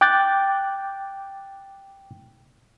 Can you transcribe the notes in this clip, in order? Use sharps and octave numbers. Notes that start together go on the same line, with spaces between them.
G5 D6 F#6 G6 A6